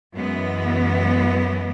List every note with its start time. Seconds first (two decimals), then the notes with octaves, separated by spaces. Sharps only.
0.15 F#2 E3 G#3 B3